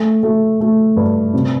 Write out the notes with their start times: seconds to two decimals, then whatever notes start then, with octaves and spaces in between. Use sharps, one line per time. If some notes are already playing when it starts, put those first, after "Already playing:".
Already playing: A3
0.23 A3
0.60 A3
0.97 G2
1.34 C3